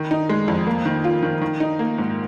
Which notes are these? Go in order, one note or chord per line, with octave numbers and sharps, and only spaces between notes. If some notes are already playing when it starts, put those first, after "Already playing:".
Already playing: D#3
D#4
G#3
F2
A#3
D#3
F4
D#3
D#3
D#4
A#3
G#2